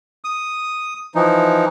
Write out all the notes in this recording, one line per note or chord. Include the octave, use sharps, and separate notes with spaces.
D#6
E3 F3 D#4